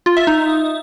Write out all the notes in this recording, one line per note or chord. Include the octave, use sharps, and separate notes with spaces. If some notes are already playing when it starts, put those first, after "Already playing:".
F4
E5
D#4